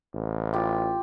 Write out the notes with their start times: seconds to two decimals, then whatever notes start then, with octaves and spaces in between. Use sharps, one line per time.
0.14 A1
0.53 F4 G4